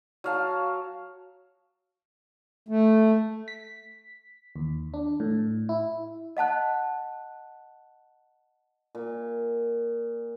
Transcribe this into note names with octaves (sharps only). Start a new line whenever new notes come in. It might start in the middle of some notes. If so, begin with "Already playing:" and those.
F#3 F5 A5
A3
B6
D#2
D4
A2
E4
D#5 F#5 A5 F#6
A#2